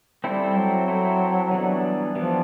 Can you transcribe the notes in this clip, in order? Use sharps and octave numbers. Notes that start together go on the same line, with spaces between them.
G3 C4 E4 A4 C5
F#3
C4 E4 A4 C5
E3 G3 B3 D4
E3 F3 G3 B3 D4